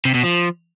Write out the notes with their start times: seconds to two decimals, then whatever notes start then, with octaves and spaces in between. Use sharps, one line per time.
0.05 C3
0.14 B2
0.23 F3